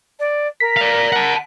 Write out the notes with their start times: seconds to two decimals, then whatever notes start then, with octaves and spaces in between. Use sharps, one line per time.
0.19 D5
0.60 A#4 B6
0.77 D5 F5
1.12 F#5 A5